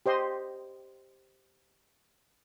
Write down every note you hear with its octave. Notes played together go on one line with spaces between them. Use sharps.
G4 C5 D#5 C6